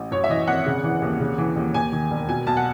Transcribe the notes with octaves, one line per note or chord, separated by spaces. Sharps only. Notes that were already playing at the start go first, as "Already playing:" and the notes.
Already playing: A1
F#2 C#5
E5
E3 D#5
G#1 F#5
C#3
E3
D#2
C#3
E3
D#2
D#2 G#5
D#3
E1
B2 G#5
B1 A5
F#5